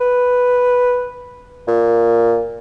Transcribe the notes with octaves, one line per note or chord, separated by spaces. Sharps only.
B4
A#2